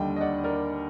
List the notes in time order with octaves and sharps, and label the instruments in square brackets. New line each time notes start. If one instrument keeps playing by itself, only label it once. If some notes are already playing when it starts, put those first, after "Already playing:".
Already playing: [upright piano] D#2 D3 G3 D#5 G5
D#5
D5 F#5
A#4 D5